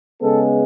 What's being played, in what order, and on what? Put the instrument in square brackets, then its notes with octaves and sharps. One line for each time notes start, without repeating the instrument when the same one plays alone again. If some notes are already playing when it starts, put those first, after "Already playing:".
[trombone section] C#3 G#3 B3 A4